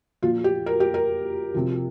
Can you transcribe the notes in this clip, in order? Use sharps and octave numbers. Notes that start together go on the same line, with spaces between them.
A#2 F3 F4
G4
A#4
G4
A#4
C3 F3